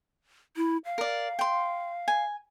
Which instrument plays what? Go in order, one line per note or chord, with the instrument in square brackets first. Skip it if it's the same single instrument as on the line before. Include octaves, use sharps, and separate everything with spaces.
[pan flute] E4
F5
[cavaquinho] A#4 D5
G5 C6
G#5